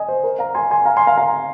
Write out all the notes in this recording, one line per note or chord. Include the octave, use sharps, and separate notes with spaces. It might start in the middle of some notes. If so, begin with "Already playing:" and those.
Already playing: D#5 G#5
C5
A#4
F5 A#5
G#5 C6
G#5 C6
F5 A#5
G#5 C6
F5 A#5
F5 A#5